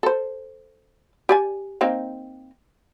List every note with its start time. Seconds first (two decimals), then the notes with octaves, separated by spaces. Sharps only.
0.03 A4 C5
1.29 G4 D5 G#5
1.81 A#3 C4 D#4